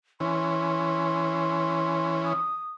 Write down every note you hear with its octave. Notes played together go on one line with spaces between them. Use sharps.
E3 C#4 C6
D#6